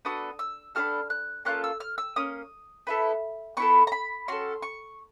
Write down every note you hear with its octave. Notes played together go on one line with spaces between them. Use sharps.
B3 D4 F#4 A4 D#6
E6
B3 D4 F#4 A4 F6
F#6
A#3 C#4 F4 A4 F#6
E6
F6
E6
A#3 C#4 D#6
B3 E4 A4
B3 E4 A4 C#6
A#5
B5
C#4 F#4 A4 C6
C#6